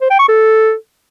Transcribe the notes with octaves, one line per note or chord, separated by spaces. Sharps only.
C5
G5
C#6
A4